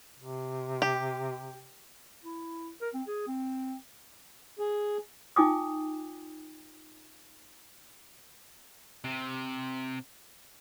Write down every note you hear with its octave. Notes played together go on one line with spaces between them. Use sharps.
C3
G4
E4
A#4
C4
G#4
C4
G#4
D#4 F4 G5 G#5 D6 D#6
C3